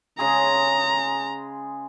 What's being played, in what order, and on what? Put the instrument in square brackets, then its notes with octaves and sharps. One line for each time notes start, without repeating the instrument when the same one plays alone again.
[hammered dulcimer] C#3 G#3 G#4 [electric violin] A#5